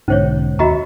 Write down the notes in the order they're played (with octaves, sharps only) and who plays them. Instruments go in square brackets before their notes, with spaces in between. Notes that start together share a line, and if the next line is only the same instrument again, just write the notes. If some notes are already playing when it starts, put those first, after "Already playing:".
[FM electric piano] B1 B2 D3 [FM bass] G#2 [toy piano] C#4 C5 C#5
[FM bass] D#2 [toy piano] F#4 D#5 A#5 [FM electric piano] E5 B5 C#6